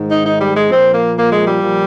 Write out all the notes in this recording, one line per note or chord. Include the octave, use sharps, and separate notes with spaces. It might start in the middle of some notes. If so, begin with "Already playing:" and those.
Already playing: G#2 D#3
D#4
D#4
G3
G#3
A#2 F3 C4
A#3
A#3
G#3
G3
A#2 F3